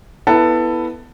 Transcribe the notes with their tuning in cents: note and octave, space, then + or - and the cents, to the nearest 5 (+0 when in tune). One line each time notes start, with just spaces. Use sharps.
B3 +0 E4 +0 A4 +15